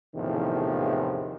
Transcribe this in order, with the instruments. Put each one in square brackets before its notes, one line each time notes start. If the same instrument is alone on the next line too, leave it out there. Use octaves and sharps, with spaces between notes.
[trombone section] A#1 E2 A2 C3 D#3 F3